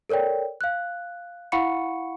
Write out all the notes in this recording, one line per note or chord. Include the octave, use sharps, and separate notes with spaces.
A4 A#4 C#5 D5 G5
F5 F#6
E4 F5 F#5 B5 C#6 C#7